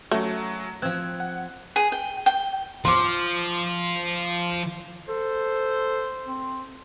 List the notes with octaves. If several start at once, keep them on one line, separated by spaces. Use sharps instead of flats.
F#3 A3 C#4 F#4
F3 C4 F#6 G#6
F#5
G#4
G5
G5
F3 C6 D6
A4 C5
C4